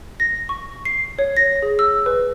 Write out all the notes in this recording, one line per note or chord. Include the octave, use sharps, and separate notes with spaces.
A#6
C#6
C7
C#5
A#6
G#4
E6
B4